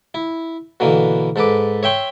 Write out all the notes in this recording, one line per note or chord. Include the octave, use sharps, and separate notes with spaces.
E4
B2 D3 E3 A#3
G#2 A4 B4 D6
C#5 E5 G5 C6 C#6